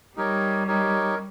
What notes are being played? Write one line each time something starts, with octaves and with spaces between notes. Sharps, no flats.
G3 D#4 G4 A#4 C#5
D#4 G4 A#4 C#5